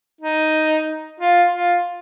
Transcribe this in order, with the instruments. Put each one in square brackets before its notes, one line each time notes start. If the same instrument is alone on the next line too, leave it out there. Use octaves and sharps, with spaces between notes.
[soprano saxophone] D#4
F4
F4